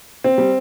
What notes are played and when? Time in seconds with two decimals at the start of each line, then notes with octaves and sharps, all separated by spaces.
0.24 C4
0.38 G3